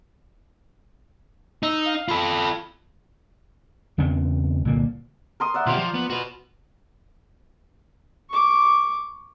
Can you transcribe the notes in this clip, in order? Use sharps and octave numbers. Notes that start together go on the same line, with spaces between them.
D#4 E6
F5
F4 A4 B5
E2 C#3 B3 C4
C2 A#2 D3 A#3
A#4 C6 D#6
D5 E5 F#5
B2 F4 G4 C5
F3
B3
F#4 B4
C#6 D6